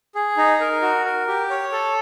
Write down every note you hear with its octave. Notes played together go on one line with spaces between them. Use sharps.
G#4
D#4
A#4
F#4
A#4
G4
C#5
A4